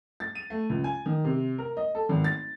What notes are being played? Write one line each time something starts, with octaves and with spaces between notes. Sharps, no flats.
A6
D#7
A3
C#2
G#5
D#3
C3
A#4
D#5
A4
G#1
A6